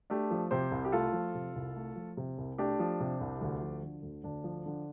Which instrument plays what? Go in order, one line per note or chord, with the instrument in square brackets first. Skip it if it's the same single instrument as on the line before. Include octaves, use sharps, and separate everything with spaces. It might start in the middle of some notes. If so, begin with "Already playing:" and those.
[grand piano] A3 D4 G4
F3
C3 G4 C5
C2
G4
A3 F4 A4
F3
C3
C2
A3
F3
C3
C2
A3 D4 G4
F3
C3
C2
D2
F3
D3
D2
D2 D4
F3
D3